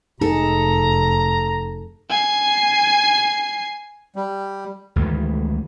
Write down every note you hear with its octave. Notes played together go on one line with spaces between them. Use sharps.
F1 D#4 G#4 A4 A#5
G#5 C7
G3
D2 G#2 D#3 E3